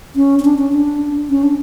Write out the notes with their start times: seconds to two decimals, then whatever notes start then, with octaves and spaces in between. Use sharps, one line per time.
0.15 C#4
0.39 C#4
0.45 D4
0.58 C#4
0.73 D4
1.30 C#4
1.43 D4